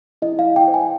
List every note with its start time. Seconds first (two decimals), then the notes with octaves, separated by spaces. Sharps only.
0.22 E4 D#5
0.39 F5
0.45 E4
0.56 G5
0.68 C5
0.74 G#5